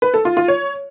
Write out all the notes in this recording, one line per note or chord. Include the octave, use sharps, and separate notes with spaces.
B4
A4
F4
F4
C#5